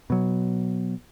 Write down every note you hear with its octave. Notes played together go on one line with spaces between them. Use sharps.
B2 F#3